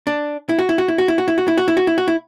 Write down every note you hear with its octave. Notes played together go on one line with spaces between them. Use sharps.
D4
E4
F#4
E4
F#4
E4
F#4
E4
F#4
E4
F#4
E4
F#4
E4
F#4
E4
F#4
E4